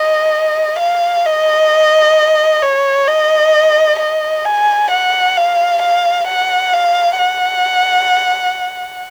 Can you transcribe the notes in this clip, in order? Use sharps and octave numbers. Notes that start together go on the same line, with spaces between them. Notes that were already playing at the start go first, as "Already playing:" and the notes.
Already playing: D#5
F5
D#5
C#5
D#5
D#5
G#5
F#5
F5
F5
F#5
F5
F#5